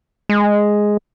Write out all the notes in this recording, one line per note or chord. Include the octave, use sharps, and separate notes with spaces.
G#3